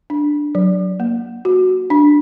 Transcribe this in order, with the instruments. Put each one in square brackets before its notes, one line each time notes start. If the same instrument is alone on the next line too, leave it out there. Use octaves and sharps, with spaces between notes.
[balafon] D4
F#3
A#3
F#4
D4